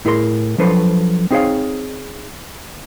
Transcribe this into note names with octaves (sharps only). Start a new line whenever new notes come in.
A2 E4 G#4 A#4 A#5 C6
F3 F#3 D4 A4 B4 C5
C4 D#4 G#4 C5 C#5 F5